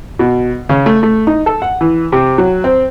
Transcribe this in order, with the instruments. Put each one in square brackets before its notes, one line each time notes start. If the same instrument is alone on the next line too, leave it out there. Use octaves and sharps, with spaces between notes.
[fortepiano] B2
C#3
A3
A3
D#4
A4
F#5
E3
C3
F#3
C4